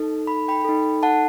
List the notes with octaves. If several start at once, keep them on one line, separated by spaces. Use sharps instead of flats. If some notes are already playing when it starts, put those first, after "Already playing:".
Already playing: D#4 A4
B5
G5 B5
D#4 A4
F#5 A5